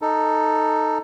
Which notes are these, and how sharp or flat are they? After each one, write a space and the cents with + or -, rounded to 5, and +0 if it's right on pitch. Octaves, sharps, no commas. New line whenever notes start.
D#4 +0 A4 +10